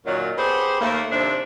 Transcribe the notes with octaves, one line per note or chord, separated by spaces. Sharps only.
F#2 A#2 D#3 F#3
B3 G4 G#4 C5
D#2 A3 A#3
D#2 C3 F3 D4 E5